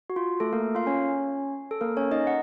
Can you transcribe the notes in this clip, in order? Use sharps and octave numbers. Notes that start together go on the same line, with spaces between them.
F#4
F4
A3 A4
A#3 A#4
F4 F5
C#4 C#5
A4
A#3 A#4
C#4 C#5
D#4 D#5
F#5